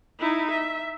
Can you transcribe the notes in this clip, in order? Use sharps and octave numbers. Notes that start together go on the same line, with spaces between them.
D#4 E4
E5